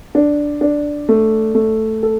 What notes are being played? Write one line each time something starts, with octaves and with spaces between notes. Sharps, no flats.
D4
D4
A3
A3
A4